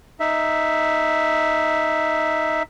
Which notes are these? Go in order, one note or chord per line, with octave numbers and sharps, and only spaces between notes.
D#4 E5